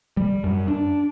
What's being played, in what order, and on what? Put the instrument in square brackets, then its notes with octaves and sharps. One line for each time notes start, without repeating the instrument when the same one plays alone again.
[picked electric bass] G3
F#2
D4